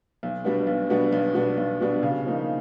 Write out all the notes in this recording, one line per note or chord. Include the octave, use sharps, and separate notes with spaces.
B1
B2 G3 B3 D4
B1
B2 G3 B3 D4
B1
B2 G3 B3 D4
B1
B2 G3 B3 D4
C#3
F3 A#3 D#4